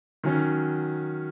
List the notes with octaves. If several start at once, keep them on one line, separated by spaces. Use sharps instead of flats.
D#3 F#3 C#4